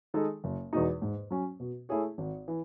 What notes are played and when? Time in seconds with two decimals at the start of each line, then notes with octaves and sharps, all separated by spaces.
0.14 D#3 G#3 D#4 A4
0.44 F#1
0.73 E2 B2 G#3 D#4
1.02 G#2
1.31 F#3 C#4
1.60 B2
1.89 A3 E4 G#4 C#5
2.18 G#1
2.48 E3